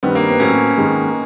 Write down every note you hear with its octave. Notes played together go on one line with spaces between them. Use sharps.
G2 D#3 G3 B3 C4
A#3
B3
A2 F#3 A3 C4 C#4
G#2 D#3 G#3